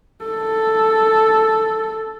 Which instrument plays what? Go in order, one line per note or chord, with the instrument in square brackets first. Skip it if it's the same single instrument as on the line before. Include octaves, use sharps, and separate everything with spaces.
[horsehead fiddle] A4